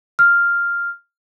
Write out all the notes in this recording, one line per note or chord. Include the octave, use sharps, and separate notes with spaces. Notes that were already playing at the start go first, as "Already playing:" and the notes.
F6